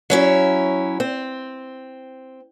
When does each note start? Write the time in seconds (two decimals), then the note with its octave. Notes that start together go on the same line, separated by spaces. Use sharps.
0.10 F#3 C#4 E4
1.00 C4